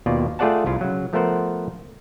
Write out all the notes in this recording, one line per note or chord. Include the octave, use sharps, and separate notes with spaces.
D#2 B2 A#3 F4 D5
A3 F4 G#4 D5 F#5 A5
C2 E4 F4
C#3 F#3
F3 A3 B3 A#4 C5 F#5